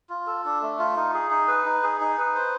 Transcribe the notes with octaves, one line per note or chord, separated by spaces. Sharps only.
F4
A4
D4
A3
F4
D#4
G#4
D#4
B4
D#4
G#4
D#4
B4
C5